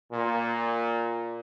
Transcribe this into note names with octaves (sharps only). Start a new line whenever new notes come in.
A#2